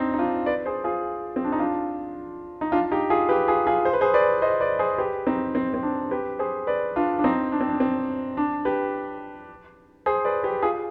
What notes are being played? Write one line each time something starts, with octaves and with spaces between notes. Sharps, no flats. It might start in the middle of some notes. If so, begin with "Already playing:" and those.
Already playing: C4 D4 D#4
D#4
D4 F4
B4 D5
G#4 C5
F4 G#4
C4
D4
D#4
D4 F4
D#4
D4 F4
D#4 G4
F4 G#4
G4 B4
F4 G#4
F4 G#4
C5
B4
G#4 C5
B4 D5
C5 D#5
B4 D5
G#4 C5
G4 B4
C4 D#4
C4
C4
D4
G4 B4
G#4 C5
B4 D5
D4 F4
D4
C4 D#4
D4
C4
D4
C4
D4
G4 B4
G#4 C5
B4 D5
G4 B4
F4 G#4